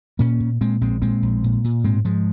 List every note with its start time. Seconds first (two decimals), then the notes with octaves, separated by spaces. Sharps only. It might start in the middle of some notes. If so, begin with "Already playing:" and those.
0.19 A#2 A#3 C#4
0.40 A#2
0.61 A#2 G#3 C4
0.81 A#1 G#3 C4
1.02 A#2 G#3 C4
1.22 A#1
1.44 A#2
1.64 A#2
1.84 G#2 G#3 C4
2.05 G#2 F3 G#3